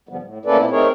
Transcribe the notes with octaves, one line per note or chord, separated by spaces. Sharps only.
G#2 D3 F3 G3 B3
A2
A3 A#3 C#4 A4 B4 D5
A#2 C4 E4
A3 C4 D#4 G#4 A#4 C#5